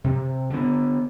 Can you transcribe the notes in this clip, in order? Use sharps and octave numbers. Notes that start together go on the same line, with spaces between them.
C3
D3 B3